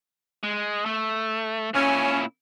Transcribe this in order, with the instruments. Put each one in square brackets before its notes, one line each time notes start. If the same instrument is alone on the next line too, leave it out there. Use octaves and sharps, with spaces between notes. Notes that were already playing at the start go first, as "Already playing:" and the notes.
[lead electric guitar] G#3
A3
[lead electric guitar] A#2 E4 [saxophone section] C#4